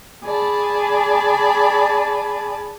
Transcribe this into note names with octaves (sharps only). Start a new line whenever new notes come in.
G#4 D5 A5 B5